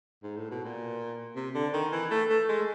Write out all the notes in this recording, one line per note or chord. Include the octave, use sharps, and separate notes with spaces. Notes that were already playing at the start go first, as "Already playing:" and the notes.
G#2
A2
B2
A#2
C3
D3
D#3
E3
A3
A3
G#3